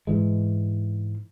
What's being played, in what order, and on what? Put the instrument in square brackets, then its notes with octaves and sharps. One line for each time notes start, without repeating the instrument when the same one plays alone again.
[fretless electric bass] G#2 E3 G#3